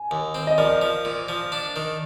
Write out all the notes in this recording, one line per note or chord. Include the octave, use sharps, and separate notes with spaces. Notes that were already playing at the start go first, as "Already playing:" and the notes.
Already playing: G#5
D#2
C4
D#5
F3 A#4 D5
F3
A#2
F3
D4
D#3